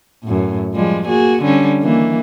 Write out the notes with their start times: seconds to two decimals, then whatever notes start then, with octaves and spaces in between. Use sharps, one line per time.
0.24 F#2 A2
0.75 F3 G3 G#3
1.08 A#3 F#4 G#4
1.44 D3 G3 C#4
1.82 D#3 E3 A#3